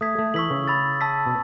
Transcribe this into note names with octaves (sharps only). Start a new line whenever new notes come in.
A3 D#6 G#6 B6
A3
E3 C#6 E6 B6 F#7
C#3
B5 E6 A6
A5 E6 B6
B2